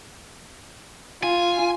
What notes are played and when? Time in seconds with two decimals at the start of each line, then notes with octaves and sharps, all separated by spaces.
1.23 F4 G#5